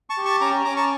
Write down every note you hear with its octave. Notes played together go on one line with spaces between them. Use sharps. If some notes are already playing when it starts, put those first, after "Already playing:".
A5 C#6
G4
A5 C#6
C#4 A#5 D6
C#4 A#5 D6
A5 C#6